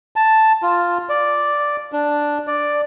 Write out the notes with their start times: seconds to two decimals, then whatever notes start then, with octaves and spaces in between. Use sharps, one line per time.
0.16 A5
0.63 F4
1.09 D5
1.93 D4
2.47 D5